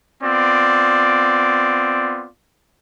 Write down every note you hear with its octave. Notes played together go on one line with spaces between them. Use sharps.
B3 C4 F4 D5